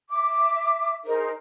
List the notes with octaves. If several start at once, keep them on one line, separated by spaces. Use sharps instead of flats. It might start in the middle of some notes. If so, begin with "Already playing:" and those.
E5 D6
D#4 G#4 A#4 C5